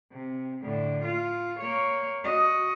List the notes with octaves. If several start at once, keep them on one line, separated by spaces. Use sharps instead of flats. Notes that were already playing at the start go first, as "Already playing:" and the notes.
C3
A2 D3
F4
A#3 C#5
F#4 D#5